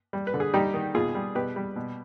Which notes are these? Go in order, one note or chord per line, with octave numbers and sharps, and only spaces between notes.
G3
B4
D3
G#4
G3 D#4 G4
D#3
B2 F4 G#4
G3
B2 G4 B4
G3
B2